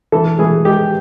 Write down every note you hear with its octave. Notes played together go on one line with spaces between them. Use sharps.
E3 A4
E3 G#4
G#3 G4